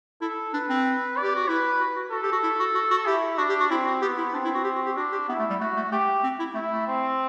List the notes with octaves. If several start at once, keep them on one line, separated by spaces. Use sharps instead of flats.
E4 A4
D4 B4
C4
D5
G4
F#4
E4 B4
F#4
F#4
F#4 A4
G4
F#4
E4
F#4
F#4
F#4
E4 G4
D4 F#4
G4
F#4
C4 E4
F#4
B3 G4
E4
C4 D4
E4
F#4
G4
F#4
G4
D4 F#4
G4
B3 E4
A3
G3
A3 F#4
A3
A3 G4
C4
E4
A3 E4
A3
C4